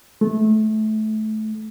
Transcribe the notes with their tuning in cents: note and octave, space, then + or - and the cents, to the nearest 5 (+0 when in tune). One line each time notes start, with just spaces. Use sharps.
A3 -20